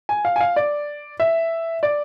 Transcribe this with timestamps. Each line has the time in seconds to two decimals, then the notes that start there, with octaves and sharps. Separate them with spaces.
0.09 G#5
0.25 F5
0.36 G#5
0.41 F5
0.56 D5
1.20 E5
1.83 D5